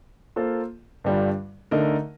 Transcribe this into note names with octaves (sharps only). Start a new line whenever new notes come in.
A#3 F4 A4 C5
G2 D3 G3 D4 F4
D3 A3 D#4 A#4 D#5